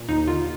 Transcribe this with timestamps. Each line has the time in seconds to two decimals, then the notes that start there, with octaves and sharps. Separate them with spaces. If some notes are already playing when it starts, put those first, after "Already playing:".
Already playing: A#2
0.08 D#2 D#4
0.27 D3 F4